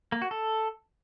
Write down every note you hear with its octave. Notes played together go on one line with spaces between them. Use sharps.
A#3
F#4
A4